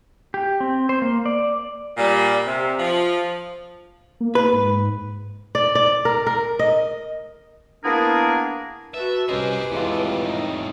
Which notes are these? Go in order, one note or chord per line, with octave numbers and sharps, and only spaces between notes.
G4
C4
C5
A#3
D5
A#2 G3
C3
F3
A#3
B4
G#2
D5
D5
A#4
A#4
D#5
A#3 B3 D4 E4 G#4 A#4
F#4 B4 E5 A5
C2 C#4 G4 G#4 B4 C5 D#5 D6
F2 A2 E3 G#3 F4
D#4 D#5